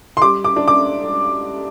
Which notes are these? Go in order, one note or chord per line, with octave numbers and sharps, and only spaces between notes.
C6
G3 D6
D6
D4
D6